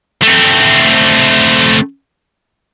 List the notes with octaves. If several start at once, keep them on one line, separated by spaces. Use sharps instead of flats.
A3 C4